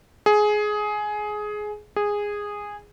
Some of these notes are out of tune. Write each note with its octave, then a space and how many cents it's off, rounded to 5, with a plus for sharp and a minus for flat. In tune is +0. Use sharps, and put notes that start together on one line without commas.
G#4 +15
G#4 -10